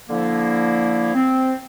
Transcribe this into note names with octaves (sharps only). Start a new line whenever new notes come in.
D3 F3 A#3 E4
C4